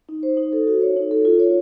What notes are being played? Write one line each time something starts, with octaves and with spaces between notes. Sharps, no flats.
D#4
C5
D#4
A4
F#4
C#5
D#4
A4
F4
C#5